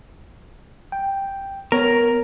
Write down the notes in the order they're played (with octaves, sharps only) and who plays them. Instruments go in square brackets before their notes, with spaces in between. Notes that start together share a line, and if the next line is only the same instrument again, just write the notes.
[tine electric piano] G5
[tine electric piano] B3 C#5 [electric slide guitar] A#4